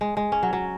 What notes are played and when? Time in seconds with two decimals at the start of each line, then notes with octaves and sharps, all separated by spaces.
0.01 G#3
0.17 G#3
0.32 C#4
0.43 F#3
0.53 F#3